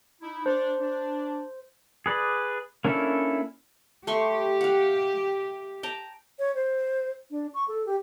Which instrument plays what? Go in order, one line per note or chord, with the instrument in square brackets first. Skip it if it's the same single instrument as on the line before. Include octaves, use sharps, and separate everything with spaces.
[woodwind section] D#4 E4
[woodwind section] D4 [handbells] C5
[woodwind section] D4
[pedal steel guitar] G#4 B4 D5
A#3 C#4 D4 E4 A4
[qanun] A3 C6 C#6 [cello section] G4
[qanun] F5 F#5
G5 A5 A#5
[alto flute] C#5
C5
D4
C#6
A4
G4